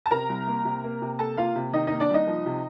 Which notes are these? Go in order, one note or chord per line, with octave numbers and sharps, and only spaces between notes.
A5
C3 A#4 A#5
C2
A#3
C3
A#3
C3
A#3 A4 A5
A#3 F4 F5
C3
D#3 D#4 D#5
A#3 D#4 D#5
D4 D5
C2 D#4 D#5
F3
C3